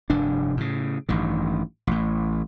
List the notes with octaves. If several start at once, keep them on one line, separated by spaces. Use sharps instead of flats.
F1 G2 D4
A2 C#3
A1 G2 D#3
A1 A2